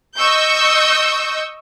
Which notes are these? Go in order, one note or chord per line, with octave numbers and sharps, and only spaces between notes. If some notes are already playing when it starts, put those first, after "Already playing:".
D#5 C#6 E6 G6